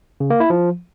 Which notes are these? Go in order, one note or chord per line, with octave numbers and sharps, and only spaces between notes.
C#3
A#3
E4
F3